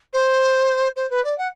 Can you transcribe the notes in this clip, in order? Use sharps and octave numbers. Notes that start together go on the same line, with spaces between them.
C5
C5
B4
D5
F#5